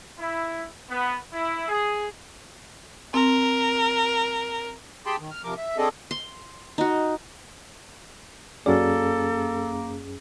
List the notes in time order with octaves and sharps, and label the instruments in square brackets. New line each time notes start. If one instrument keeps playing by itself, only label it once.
[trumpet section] E4
B3
E4
G#4
[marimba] C4 [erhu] A#4
[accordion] G4 G#4 G5 A5 B5 C6
D#3
F6
C3 F3 A#4 D6
E5
C4 D4 G#4 A4 D#5
[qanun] C6
D#4 F#4
[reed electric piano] F#2 C#4 G#4 [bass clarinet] A#3 [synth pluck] F#4 D5 [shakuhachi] A4